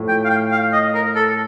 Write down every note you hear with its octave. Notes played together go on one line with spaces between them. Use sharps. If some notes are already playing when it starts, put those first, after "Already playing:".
Already playing: A2 F3 A3
G5
F5
G5
F5
D#5
A#4
A4